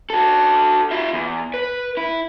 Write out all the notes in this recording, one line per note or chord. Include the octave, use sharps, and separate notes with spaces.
F#4 A4
F4 E5
E2
B4
E4